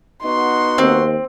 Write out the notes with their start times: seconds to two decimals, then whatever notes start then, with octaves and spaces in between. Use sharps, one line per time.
0.24 B3 D#4 F#4 C6
0.78 D#2 C4